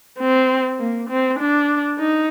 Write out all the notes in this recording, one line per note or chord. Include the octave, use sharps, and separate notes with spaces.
C4
A#3
C4
D4
D#4